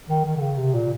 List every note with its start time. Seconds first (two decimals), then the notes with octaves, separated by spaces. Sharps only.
0.09 D#3
0.25 D#3
0.37 D3
0.41 C#3
0.57 C3
0.74 A#2